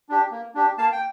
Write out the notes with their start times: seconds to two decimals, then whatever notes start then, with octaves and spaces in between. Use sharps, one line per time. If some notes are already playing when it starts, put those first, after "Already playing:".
0.09 D4 G4
0.31 A#3
0.54 D4 G4
0.78 A#3 F5 A5
0.92 G5